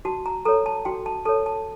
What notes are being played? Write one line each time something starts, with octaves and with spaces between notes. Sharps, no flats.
F#4 A5
A#5
A4 C#5 A#5
A5
F#4 G5
A5
A4 C#5 A5
A5